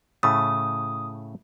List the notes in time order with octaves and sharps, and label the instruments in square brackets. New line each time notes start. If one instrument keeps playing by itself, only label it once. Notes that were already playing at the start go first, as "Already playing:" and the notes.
[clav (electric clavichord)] A2 C#3 A3 [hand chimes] D#6